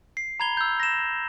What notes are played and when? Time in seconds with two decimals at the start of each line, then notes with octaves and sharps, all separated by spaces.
0.17 C7
0.40 A#5 B5 G#6 F7 G7
0.57 E6 G6
0.80 A#6 E7